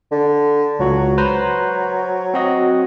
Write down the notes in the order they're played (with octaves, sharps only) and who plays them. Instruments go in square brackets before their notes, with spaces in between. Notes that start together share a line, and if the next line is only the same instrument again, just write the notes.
[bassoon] D3
[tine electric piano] C#2 F#4 [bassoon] F#3
[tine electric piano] B4 C5 A#5
C4 F#4 D#5